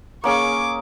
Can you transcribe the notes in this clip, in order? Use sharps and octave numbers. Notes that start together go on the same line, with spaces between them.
A#3 C#4 G#4 C#6 D6